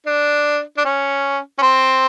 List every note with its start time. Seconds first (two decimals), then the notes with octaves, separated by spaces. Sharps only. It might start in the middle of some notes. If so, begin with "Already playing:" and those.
0.06 D4
0.77 D4
0.85 C#4
1.58 C#4
1.62 C4